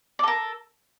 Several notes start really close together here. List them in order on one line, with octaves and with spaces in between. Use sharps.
D5 A4 A#4